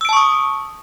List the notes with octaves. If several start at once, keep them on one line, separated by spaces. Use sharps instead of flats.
A5 C#6 D#6 E6 D7